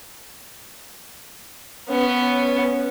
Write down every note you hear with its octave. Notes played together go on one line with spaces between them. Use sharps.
B3 C#4